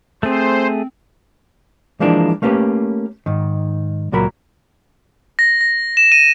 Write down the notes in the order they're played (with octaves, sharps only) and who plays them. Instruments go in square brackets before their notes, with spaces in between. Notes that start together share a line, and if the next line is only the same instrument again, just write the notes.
[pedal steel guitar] A3 G#4 [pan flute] C4 [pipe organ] C5
[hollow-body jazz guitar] E3 F3 G#3 A#3 D4
A3 A#3 C#4 G4 B4
G#2 D#3
C#2 A#2 F#3 A#4 B5
[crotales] A#6
A#6
E7
D#7